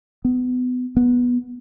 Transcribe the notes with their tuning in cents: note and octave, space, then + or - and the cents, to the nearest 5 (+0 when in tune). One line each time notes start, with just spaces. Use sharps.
B3 +25
B3 -10